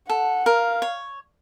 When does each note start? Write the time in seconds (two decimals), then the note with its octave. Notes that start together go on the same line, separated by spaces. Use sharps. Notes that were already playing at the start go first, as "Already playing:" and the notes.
0.09 A4 F#5
0.46 A#4 F5
0.82 C#5